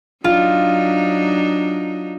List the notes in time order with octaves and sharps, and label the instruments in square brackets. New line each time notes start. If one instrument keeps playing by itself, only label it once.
[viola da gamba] F#3 D4 D#4 [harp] F4